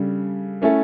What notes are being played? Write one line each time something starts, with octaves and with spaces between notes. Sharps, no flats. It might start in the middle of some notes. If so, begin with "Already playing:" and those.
Already playing: C#3 G3 D4 A4
A3 C#4 E4 A4